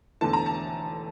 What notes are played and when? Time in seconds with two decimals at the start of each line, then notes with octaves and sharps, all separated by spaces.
0.21 E1 E2 D3 A3 A5
0.33 A#5
0.46 A5